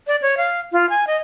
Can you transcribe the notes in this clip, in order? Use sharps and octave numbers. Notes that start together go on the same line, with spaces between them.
D5
C#5
F5
F4
G#5
D#5